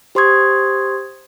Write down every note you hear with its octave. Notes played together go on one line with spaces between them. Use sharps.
G4 C5 C6 C#6 D#6 G#6